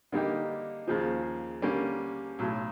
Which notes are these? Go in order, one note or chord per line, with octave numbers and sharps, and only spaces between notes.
D3 G3 A#3 D#4 G4
D#2 C#3 F3
D3 G3 A#3 C#4
B1 A2 F#3